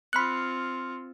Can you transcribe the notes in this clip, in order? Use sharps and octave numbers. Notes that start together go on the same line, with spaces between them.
C4 F4 B5 C6 F6 F#6 C#7